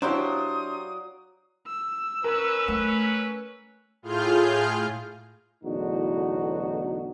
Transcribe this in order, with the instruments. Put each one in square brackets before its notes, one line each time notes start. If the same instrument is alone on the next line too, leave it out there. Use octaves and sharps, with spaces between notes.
[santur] F#3 D5 [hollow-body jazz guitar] D4 E4 G4 [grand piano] C5 F5 [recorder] D#6
[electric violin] E6
[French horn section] C#4 B4 [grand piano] A#4
[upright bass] A3
[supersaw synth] A2 F4 G#4 F6 G6
[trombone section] B1 E2 A2 D3 D#4 F#4